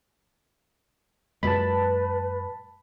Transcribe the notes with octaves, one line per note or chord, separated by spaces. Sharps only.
F#2 A#2 G#3 B4 A5 B5